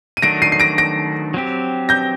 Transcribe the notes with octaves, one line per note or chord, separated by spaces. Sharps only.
D#7
D#3 F#3 A3 D4 F#4 A#6 D7
C7 D#7
C7
A#6 D7
A#6 D7
F#3 C4 G4
G6 A#6